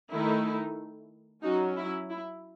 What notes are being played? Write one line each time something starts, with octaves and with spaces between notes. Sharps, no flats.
D#3 A3 D#4 E4
F#3 C#4 D#4 F#4
E4
E4